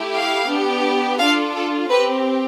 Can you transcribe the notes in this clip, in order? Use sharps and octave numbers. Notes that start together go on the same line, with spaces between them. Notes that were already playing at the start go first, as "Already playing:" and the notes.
Already playing: A3 E4 G4
F5
B3 D4 G4
D4 F4 A4 F5
A4
C4 G4 B4